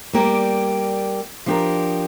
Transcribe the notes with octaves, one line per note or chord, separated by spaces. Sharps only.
G3 A#3 G4 D5
F3 D4 G4 A#4